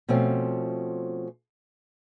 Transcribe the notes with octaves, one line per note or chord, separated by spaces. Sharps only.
B2 F3 A3 C4 C#4